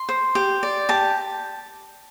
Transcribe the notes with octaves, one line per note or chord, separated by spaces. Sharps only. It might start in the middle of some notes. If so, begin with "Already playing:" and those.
Already playing: C6
C5
G4
D5
G4 A5